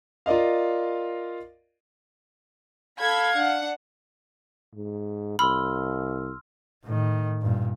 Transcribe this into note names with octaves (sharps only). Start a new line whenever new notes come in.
F4 A#4 D5 D#5 F5
A4 F5 B5 G#6
D4 F#5
G#2
C2 B5 C6 E6 F6
A2 D#3
G2 A#2